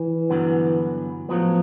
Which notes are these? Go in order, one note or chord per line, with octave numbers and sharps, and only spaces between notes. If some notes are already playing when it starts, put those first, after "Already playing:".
Already playing: E3
G2 D3 F#3 B3
A2 F3 F#3 B3